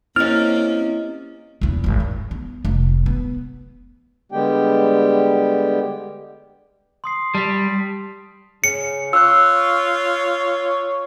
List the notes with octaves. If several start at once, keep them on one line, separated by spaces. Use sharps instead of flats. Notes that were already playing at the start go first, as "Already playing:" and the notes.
A#3 C4 C#4 E4 G4 D#5 F6
A#1 E2
G#1 D#2
C#4
B3
F1
B3
D3 G3 G#3 B3 G4 G5
C6 D#6 C7
G3 A5 C6 B6
C#3 C#7
F4 C#5 E6 F#6